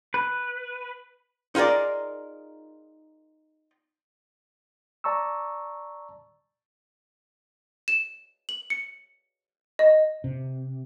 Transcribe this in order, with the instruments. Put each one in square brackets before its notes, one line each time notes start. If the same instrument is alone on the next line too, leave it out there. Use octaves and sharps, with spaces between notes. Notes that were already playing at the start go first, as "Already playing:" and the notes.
[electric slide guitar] B4
[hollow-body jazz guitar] D#4 F4 G#4 A#4 D5
[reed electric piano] D5 A5 A#5 C#6 E6
[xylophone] E7
F#7
C#7
D#5
[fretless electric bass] C3